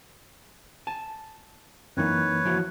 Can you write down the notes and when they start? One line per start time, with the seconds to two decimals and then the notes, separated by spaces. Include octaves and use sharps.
0.87 G#5 A5
1.97 F#2 E3 A#3 C4 D#4 B4 C#5
2.45 F3 E4 F#4